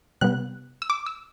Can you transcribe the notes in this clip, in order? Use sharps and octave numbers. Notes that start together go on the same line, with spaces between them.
C3 G3 B3 F#6
E6
D6
E6